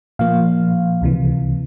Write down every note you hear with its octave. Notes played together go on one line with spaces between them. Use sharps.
A#2 F3 A#3 F5
C#2 C3 E3